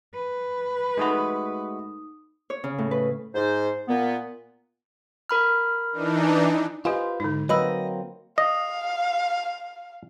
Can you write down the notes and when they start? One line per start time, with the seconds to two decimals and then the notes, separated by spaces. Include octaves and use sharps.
0.14 B4
0.97 G#3 A3 D#4 F#4 D#6
2.50 C#5
2.64 C#3
2.78 A2
2.91 B4
3.35 G#2 C5
3.88 A#2 B3
5.29 A#4 B5 F6
5.92 E3 D4 D#4
6.85 F4 G4 B4 C5 D#5 G#5
7.20 G#2 D3 D#4
7.49 F#3 A#3 C4 B4 D#5 B5 E6
8.38 D#5 F5